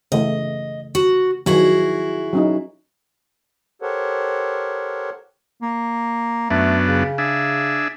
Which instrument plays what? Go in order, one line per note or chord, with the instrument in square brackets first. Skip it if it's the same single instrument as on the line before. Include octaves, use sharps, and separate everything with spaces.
[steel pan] C#3 E3 A3 [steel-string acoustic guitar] D#5
[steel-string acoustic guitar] F#4
[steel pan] D#3 F3 F#3 [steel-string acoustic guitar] E4 F#4 G#4
[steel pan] F#3 C#4 D#4
[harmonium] G4 A4 A#4 C5 C#5 F#5
[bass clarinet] A#3
[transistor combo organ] F#2 B3 D4 [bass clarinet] A3
[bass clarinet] C#3
[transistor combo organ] D4 G#4 E5